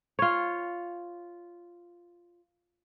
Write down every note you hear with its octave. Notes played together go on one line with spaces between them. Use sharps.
F4 C#5